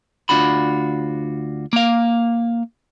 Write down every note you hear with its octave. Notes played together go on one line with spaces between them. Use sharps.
D2 B2 D4 F4 F#4 B5
A#3 F5